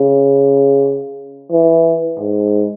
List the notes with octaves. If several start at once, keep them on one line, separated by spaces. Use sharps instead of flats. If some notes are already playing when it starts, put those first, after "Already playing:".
Already playing: C#3
E3
G#2